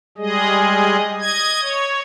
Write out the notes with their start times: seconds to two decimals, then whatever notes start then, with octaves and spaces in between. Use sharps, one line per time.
0.18 G3 G#3 G#4 D#5
1.20 D#5 G#6
1.61 C#5